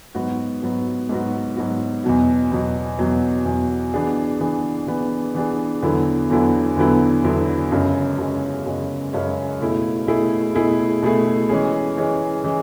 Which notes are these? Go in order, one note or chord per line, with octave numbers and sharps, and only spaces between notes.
G#2 F#3 B3 F#4
G#2 F#3 B3 F#4
G#2 F#3 B3 F#4
G#2 F#3 B3 F#4
E2 B2 F#3
E2 B2 F#3
E2 B2 F#3
E2 B2 F#3
E3 B3 D4 G#4
E3 B3 D4 G#4
E3 B3 D4 G#4
E3 B3 D4 G#4
E2 D3 F#3 B3 E4
E2 D3 F#3 B3 E4
E2 D3 F#3 B3 E4
E2 D3 F#3 B3 E4
F#2 C#3 G#3 C#4
F#2 C#3 G#3 C#4
F#2 C#3 G#3 C#4
F#2 C#3 G#3 C#4
B2 A3 E4 G#4
B2 A3 E4 G#4
B2 A3 E4 G#4
B2 A3 E4 G#4
E3 G#3 C#4 G#4
E3 G#3 C#4 G#4
E3 G#3 C#4 G#4